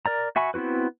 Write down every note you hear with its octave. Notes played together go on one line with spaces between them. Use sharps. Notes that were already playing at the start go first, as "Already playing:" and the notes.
A#4 D5 A#5
F#4 E5 G#5 B5 C#6
B3 C4 E4 F#4 B4